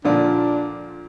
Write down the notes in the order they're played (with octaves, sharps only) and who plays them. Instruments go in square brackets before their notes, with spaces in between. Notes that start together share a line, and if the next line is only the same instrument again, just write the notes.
[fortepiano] A#2 D3 F3 [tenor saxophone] D4